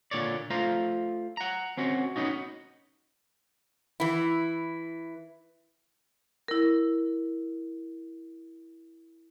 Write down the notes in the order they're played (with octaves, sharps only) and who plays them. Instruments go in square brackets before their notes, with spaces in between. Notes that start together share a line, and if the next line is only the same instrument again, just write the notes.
[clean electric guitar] A#2 D3 C#5 D5
A3 F4 C5 A#5
F#5 A#5
C4 C#4 F#4
B3 C#4 D#4 F#4
[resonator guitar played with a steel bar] E3 E4
[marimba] E4 A#4